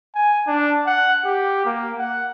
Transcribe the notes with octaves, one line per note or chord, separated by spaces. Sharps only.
G#5
D4
F#5
G4
A#3
F#5